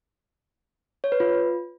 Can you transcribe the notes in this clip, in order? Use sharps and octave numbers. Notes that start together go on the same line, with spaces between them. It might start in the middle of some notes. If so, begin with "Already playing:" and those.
C#5
B4
F4